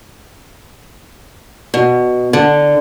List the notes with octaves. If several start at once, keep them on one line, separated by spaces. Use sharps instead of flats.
B2
D3